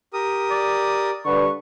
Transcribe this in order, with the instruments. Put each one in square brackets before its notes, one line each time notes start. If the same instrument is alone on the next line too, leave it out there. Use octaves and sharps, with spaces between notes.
[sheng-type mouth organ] G4 A#4 D#6
[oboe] D5
[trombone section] G2 D3 B4 [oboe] C#6